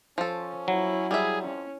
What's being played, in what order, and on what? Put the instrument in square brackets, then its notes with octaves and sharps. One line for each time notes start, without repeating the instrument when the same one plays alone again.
[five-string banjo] F3 A4 [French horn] C#4 [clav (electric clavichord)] C5
[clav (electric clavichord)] F#3 [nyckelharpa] E4
[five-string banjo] G3 E5 [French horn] G#4
[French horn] F2 [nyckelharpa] C#4